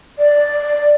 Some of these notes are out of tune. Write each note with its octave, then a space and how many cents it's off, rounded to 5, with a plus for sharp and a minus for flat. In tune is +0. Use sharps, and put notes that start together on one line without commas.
D5 +0